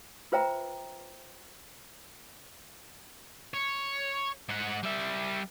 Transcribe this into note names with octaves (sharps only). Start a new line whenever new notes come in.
F4 B4 C5 E5 G5 A#5
C#5
G#2 F#5
G3 E5